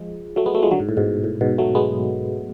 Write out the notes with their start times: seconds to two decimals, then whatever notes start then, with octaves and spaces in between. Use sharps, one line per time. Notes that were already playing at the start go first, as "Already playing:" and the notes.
Already playing: F3 G#3
0.36 F#3 A3
0.46 G#3 B3
0.55 F#3 A3
0.63 F3 G#3
0.71 D3 F#3
0.80 G#2
0.89 A2
0.97 G#2 B2
1.24 A2
1.41 G#2 B2
1.58 F#3 A3
1.75 G#3 B3